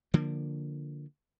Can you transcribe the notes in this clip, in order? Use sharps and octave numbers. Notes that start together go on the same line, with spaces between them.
D3 F3 A#3